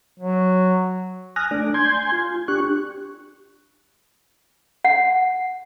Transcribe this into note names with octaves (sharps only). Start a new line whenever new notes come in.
F#3
G#5 D#6 F6 F#6 A#6
A3 D4 D5
G#5 C6 G6 G#6
F4
D4 G4 C#6 F#6
F#5